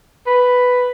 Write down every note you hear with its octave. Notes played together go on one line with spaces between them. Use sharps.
B4